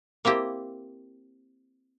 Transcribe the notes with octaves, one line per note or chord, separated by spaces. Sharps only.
A#3 C4 E4 G4